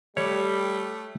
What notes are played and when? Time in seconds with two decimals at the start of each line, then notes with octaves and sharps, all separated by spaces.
0.17 G3 A3 C#5